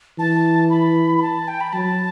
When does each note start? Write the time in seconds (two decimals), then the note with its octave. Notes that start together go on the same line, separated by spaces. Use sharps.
0.19 E3 A5
0.70 B5
1.17 B5
1.22 A5
1.48 G5
1.61 B5
1.73 F#3 A5